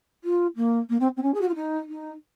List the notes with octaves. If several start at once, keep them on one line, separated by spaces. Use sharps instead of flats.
F4
A#3
A#3
C4
C4
C#4
G#4
F#4
F4
D#4
D#4